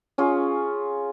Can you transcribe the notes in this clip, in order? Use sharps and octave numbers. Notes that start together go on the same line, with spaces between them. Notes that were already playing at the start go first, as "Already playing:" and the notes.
C#4 F4 G#4